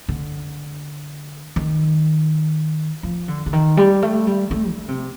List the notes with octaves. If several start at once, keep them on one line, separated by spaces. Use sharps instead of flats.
D3
D#3
F3
D3
D3
D#3
G3
A3
G3
A3
D3
C3